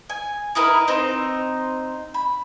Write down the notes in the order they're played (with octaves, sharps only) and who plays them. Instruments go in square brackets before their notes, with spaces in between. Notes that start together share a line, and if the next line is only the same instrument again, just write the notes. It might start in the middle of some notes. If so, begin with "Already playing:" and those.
[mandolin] G#5
D#4 E4 A#4 B4
C4 D#4
B5